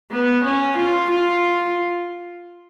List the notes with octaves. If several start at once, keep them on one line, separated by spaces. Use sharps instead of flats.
B3
C#4
F4
F4